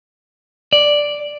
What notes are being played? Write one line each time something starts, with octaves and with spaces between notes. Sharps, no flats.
D5